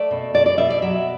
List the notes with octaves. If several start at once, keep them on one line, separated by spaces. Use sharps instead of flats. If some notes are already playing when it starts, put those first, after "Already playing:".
Already playing: A3 D5
B2
B2 D5
D5
B2 E5
D5
F#3 E5